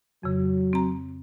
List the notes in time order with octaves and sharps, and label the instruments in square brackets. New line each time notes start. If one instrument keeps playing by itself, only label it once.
[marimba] F2 C#3 [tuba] F#3
[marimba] C4 A#5